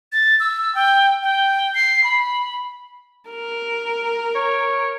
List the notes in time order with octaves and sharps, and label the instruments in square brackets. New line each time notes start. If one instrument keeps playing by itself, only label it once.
[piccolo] A6
E6
G5
G5
C7
B5
[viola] A#4
[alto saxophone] C#5